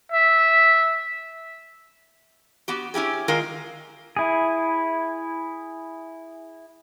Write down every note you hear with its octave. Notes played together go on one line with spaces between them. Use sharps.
E5
B3 F#4 G4
C#4 E4 G4 G#4
D#3 G#3 F4 A#4
E4 G#4